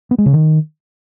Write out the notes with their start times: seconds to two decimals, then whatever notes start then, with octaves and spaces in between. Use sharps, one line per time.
0.11 B3
0.18 G#3
0.26 C#3
0.33 D#3